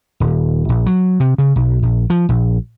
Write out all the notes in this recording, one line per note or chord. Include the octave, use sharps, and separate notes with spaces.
D#1
A#1
F#3
C3
C#3
B1
A#1
F3
A#1